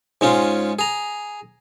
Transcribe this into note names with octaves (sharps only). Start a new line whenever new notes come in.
G#2 G#3 C#4 F4
G#4 A#5